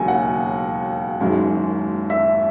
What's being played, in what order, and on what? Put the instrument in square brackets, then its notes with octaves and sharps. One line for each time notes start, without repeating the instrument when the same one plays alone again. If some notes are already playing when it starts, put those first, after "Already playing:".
Already playing: [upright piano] E1 D#2 C#3 F#3 G#5
F#5
F#1 F#2 D#3 G#3
E5